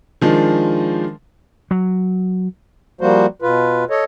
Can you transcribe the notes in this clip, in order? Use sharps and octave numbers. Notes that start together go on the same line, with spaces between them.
D#3 F3 G#3 D4
F#3
F3 G3 A#3 F#4 C5
B2 F4 B4
A4 C#5 D#5